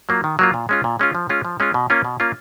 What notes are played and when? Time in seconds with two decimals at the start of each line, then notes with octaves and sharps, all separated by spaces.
0.09 F#3 A#3 F4
0.24 D#3
0.39 F#3 A#3 F4
0.54 A#2
0.69 G#3 C#4 F4
0.84 A#2
0.99 G#3 C#4 F4
1.15 F3
1.29 G#3 C#4 F4
1.45 F3
1.60 G#3 C#4 F4
1.74 B2
1.90 A#3 C#4 F4
2.05 B2
2.20 A#3 C#4 F4